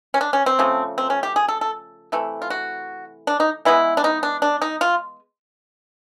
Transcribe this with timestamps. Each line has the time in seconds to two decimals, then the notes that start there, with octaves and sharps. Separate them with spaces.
0.14 C#4
0.21 D4
0.33 C#4
0.46 C4
0.59 C#3 F3 A3
0.98 C4
1.10 C#4
1.23 G4
1.36 G#4
1.48 A4
1.61 A4
2.12 C3 E3 A3
2.42 F4
2.50 F#4
3.27 D4
3.40 D#4
3.65 E3 G#3 B3 E4
3.97 D4
4.04 D#4
4.23 D4
4.42 D4
4.62 D#4
4.81 F4